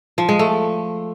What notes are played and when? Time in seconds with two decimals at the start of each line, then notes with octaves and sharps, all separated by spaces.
0.18 F3
0.29 G#3
0.39 A3